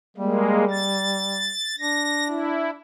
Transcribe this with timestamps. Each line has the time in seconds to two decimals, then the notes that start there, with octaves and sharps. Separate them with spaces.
0.17 G3 G#3 A#3
0.71 A6
1.79 D4 A#6
2.27 E4